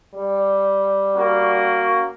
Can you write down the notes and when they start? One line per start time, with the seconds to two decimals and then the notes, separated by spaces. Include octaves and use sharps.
0.15 G3
1.16 A#3 C#4 F#4